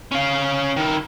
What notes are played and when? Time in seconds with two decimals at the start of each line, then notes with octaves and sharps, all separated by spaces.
0.12 C#4 F5
0.76 D#3 E4